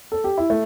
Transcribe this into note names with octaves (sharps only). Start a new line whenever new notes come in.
A4
G4
E4
A3